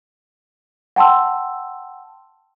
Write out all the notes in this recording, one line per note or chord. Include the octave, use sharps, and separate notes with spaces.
F#5 G5 A5 C6 E6